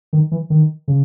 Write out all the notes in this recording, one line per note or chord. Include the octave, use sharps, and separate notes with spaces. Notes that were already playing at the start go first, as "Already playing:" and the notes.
D#3
E3
D#3
C#3